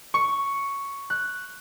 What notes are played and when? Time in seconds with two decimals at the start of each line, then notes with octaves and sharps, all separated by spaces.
0.14 C#6
1.10 F#6